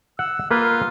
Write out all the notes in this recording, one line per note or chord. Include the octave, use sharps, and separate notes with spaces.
F#5 E6
A#3 F4 B4